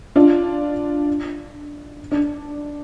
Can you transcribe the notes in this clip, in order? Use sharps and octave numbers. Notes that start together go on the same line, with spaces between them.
D4 F4
D4